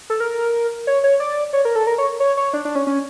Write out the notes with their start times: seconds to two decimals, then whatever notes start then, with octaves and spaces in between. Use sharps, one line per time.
0.10 A4
0.20 A#4
0.87 C#5
1.04 C#5
1.20 D5
1.53 C#5
1.65 A#4
1.76 A4
1.87 A#4
1.98 C#5
2.20 C#5
2.37 C#5
2.53 D4
2.65 D4
2.75 C#4
2.87 C#4